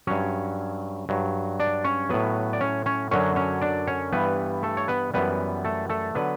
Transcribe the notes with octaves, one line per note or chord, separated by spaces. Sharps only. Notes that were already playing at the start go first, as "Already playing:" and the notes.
G2 F#3 C#4 C#5
G2 F#3
D4 D5
C#4 C#5
A2 F#3 B3 B4
D5
C#4 C#5
C#4 C#5
F#2 D3 F#3 C#4 C#5
C#4 C#5
D4 D5
C#4 C#5
G2 E3 G3 B3 B4
A3 A4
C#5
B3 B4
F#2 E3 G3 B3 B4
A3 A4
A3 A4
D3 F#3 B3 B4